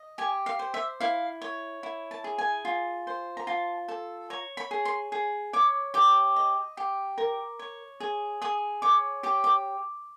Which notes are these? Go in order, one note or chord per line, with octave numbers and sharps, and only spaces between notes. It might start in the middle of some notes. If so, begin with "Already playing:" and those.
Already playing: D#5
G4 G#5
F5
C5
E5
E4 F5
C#5
E4
A5
G#4
G#5
F4
C5
A#5
F4 A5
A4
C#5 A#5
B5
G#4
C6
G#4
C#5 D6
G4 D6
D#5
G4
A#4
C#5
G#4
G#4 D#6
C#5 D6
G4 D6
D6